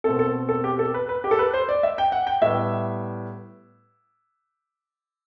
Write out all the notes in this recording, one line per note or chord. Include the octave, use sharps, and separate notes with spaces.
B2 A3 C4 A4
A4
A4
G4
A4
B4
B4
G4
A4
B4
C5
D5
E5
G5
F#5
G5
A2 G3 B3 E5